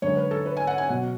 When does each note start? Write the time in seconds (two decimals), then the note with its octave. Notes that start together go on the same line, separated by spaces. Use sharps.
0.02 F#2 D3 G#3 C#5
0.17 B4
0.31 A4
0.46 B4
0.57 G#5
0.67 F#5
0.78 G#5
0.89 B2 F#3 B3 F#5